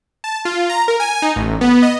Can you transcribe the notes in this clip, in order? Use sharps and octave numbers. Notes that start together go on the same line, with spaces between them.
A5
F4
A#5
A#4
G#5
D#4
A1
B3
D#5